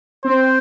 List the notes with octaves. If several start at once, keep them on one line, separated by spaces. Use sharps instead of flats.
C4 C5